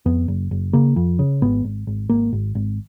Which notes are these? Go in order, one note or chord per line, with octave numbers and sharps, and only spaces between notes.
F2 B3
F#1
F#1
C#3 A#3
F2
C#3
G#1 B3
G#1
G#1
G#1 A#3
G#1
G#1